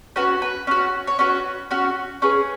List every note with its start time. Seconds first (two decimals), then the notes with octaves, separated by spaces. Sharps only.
0.16 C#4 F#4 B4
0.42 B4
0.67 C#4 F#4
1.07 C#5
1.19 C#4 F#4 B4
1.71 C#4 F#4
2.22 C#4 G#4 B4